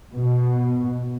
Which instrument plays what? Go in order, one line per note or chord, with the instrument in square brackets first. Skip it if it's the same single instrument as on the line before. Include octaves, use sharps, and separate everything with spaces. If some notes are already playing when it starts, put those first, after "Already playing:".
[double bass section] B2